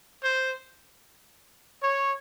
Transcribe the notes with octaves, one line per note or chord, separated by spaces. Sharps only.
C5
C#5